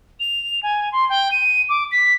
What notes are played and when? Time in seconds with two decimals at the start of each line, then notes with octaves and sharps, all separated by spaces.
0.19 F7
0.62 G#5
0.92 C6
1.09 G5
1.31 D#7
1.69 D6
1.91 B6